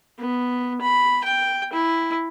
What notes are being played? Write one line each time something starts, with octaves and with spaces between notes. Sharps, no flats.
B3
B5
G5
E4